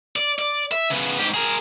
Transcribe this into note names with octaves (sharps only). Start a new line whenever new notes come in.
D5
D5
E5
C#3 B3
G#2 G4
G#4 A#4